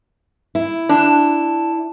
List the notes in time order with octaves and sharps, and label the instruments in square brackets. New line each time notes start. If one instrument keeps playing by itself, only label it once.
[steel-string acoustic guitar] E4
[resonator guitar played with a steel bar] D4